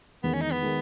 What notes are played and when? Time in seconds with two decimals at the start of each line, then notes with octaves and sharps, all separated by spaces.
0.23 E2 D#3 G#3 B3
0.33 C#4
0.42 D#4
0.52 B3
0.62 D#3 G#3